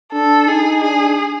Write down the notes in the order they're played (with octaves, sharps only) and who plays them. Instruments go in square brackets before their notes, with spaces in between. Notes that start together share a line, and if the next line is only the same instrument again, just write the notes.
[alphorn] D4 [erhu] A4
[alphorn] D#4 [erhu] G#4
[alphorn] D4 [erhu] G#4